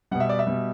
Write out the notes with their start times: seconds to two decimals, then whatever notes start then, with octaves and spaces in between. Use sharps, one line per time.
0.11 B2 G3 F#5
0.20 E5
0.29 D5
0.39 E5
0.47 B2 G3